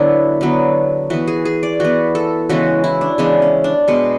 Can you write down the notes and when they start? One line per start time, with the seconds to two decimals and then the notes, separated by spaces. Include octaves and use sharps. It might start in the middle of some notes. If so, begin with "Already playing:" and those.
Already playing: D3 F#3 B3 D4 E4
0.41 D3 F#3 B3
1.10 E3 B3 F#4
1.28 G#4
1.45 G#4
1.63 D5
1.80 E3 B3 F#4
2.15 A4
2.49 C#3 E3 G#3 B3 F#4
2.84 E4
3.01 D4
3.18 C#3 E3 G#3 B3 D4
3.42 C#4
3.64 D4
3.88 B2 G#3 B3